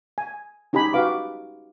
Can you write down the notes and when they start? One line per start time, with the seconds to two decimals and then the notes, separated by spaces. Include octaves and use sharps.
0.18 G#5
0.73 C#4 D#4 G4 G#5 B5
0.93 F#4 G4 B4 F5 D6